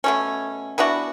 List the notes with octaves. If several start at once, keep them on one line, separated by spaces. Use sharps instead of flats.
B2 A3 C#4
E3 B3 D4 F#4